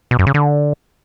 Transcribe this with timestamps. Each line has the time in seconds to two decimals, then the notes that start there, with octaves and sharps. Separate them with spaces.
0.11 B2
0.19 F#2
0.27 C#3
0.34 D3